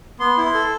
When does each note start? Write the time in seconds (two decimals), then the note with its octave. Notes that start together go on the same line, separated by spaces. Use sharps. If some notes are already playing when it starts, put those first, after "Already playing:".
0.20 B3 C6
0.37 E4
0.45 C6
0.54 A4